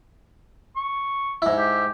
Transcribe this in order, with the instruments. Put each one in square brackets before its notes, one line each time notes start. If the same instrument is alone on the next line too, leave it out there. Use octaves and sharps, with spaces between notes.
[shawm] C#6
[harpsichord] G#2 E4
[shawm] G4